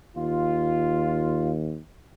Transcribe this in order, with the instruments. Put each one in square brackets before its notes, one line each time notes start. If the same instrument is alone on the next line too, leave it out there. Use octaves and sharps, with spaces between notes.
[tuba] D#2 [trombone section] F4